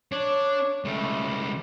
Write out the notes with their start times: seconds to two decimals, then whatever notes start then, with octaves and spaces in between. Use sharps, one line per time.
0.12 D4 C#5
0.85 C#2 G3 A3